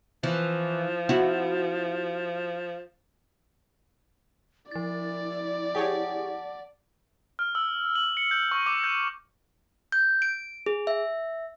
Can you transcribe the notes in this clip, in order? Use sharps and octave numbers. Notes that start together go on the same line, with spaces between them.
E3 F3
E4 F#4
F3 E4 D5 A6
G4 G#4 C#5 F#5 A5
F6
E6
F#7
C#7
G6
C#6
D6
G6
G6
D7
G#4
E5